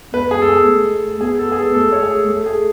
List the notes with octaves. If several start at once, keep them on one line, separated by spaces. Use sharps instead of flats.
B3 B4
G#4
A4
G#4
A3
B3 G#4
A4
G#4
A4
A3 A4
C#5
G#4
A4
A3
G#4